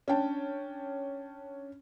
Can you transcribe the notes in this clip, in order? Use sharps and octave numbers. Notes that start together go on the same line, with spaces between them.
C#4 D4 G5 A5